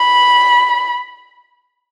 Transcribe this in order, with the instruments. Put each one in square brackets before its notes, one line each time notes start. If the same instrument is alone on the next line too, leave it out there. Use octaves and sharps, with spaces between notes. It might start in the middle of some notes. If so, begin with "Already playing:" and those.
Already playing: [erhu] B5